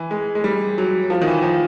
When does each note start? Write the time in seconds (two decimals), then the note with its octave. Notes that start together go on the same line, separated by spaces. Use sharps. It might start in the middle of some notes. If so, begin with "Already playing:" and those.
Already playing: E3
0.11 G#3
0.35 G#3
0.44 G3
0.78 F#3
1.10 F3
1.21 D#3
1.27 E3
1.43 F3